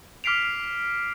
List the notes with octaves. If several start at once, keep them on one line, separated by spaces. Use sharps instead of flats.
D6 F6 B6 C7 D7 F7